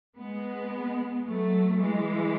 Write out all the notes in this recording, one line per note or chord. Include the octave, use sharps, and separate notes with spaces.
G#3 B3
F#3 A3
E3 G#3